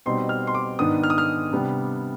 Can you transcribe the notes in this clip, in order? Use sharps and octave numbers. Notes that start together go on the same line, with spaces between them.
B2 G3 C4 D#4 C6
F6
C6
D6
G#2 D#3 B3 D4 D#6
F6
D#6
F6
C3 G3 B3 D4